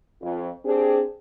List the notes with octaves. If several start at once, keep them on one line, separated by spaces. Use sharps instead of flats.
F2
C4 D4 G4 G#4